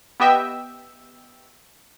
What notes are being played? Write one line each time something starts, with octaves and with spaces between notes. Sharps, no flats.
B3 G4 D#5 E5 G5 E6